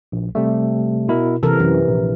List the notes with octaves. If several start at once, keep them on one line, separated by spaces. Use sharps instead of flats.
A#1
C3 G3 A3
B2 E4 A#4
C3 E3 A4 A#4
F#2 E3
A#1